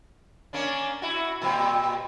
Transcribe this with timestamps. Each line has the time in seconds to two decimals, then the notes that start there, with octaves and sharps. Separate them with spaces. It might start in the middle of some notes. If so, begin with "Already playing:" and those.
0.53 A#3 C#4 D4
1.02 E4 F#4
1.42 A#2 G3 C4